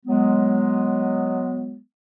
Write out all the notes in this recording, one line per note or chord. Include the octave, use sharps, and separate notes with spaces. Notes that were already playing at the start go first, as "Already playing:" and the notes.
F#3 G#3 B3